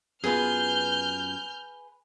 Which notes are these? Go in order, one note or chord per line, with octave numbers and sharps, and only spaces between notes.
F#2 B3 F4 G#4 B4 F6 G6